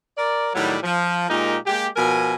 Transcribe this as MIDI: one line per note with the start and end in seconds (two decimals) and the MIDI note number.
0.18 0.50 70
0.18 0.50 74
0.54 0.77 45
0.54 0.77 51
0.54 0.77 54
0.54 0.77 55
0.83 1.27 53
1.29 1.57 46
1.29 1.57 56
1.29 1.57 63
1.29 1.57 67
1.29 1.57 70
1.67 1.88 56
1.67 1.88 58
1.67 1.88 67
1.96 2.34 47
1.96 2.34 53
1.96 2.34 70
1.96 2.34 80